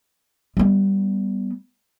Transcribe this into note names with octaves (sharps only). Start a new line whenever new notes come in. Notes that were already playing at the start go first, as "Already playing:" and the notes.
G3 B3